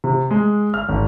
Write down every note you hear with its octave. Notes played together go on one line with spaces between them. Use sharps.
C3
G#3
F6
G#1